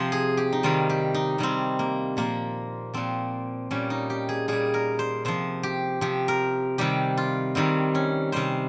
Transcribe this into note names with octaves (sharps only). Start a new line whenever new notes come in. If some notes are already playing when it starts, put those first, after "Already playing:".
Already playing: C3 F3 C5
G#4
G4
D#4
C3 D#3 G3 F4
G4
D#4
C3 D#3 G3 C4
A#3
A#2 F3 A#3
A#2 F3 C4
A#2 G3 C#4
D#4
G4
G#4
A#2 G3 G#4
A#4
C5
C3 F3 C5
G4
C3 F3 G4
A#4
C3 D#3 G3 G4
F4
C3 D#3 G3 C4
C#4
C3 G3 C5